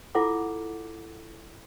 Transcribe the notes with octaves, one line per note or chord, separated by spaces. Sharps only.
E4 F4 A4 F#5 D6